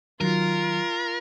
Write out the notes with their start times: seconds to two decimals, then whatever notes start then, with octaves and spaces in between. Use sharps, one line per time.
0.21 D#3 F#3 F4 A#4